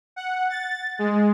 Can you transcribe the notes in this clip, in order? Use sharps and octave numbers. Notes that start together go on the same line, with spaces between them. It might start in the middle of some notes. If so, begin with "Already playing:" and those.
F#5
A6
G#3